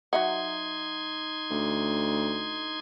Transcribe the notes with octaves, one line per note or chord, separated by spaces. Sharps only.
F#3 D#4 E5 F#5 C6 G#6
D2